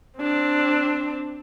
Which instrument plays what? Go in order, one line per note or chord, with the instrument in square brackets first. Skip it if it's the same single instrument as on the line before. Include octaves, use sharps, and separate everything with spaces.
[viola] C4 D4